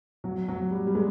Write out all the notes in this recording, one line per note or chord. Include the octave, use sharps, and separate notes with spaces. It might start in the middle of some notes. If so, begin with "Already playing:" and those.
F#3
F#3
G3
G3
G#3